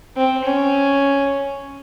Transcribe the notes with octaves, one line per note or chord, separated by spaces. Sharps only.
C4
C#4